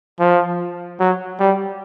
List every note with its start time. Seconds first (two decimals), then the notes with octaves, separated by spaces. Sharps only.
0.20 F3
1.00 F#3
1.40 G3